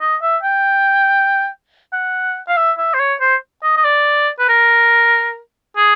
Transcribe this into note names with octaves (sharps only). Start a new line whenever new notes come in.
D#5
E5
G5
F#5
F5
E5
E5
C5
C#5
C5
D#5
D#5
D5
B4
A#4
G#4